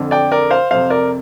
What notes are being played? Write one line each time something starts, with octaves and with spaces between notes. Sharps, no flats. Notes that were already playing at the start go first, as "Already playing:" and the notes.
Already playing: F2 D3
D5 G5
A#4 D5
C5 F5
F2 C3 C5 F5
A#4 D5